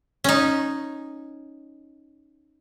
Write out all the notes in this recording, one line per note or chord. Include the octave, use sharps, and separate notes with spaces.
C#4 D#4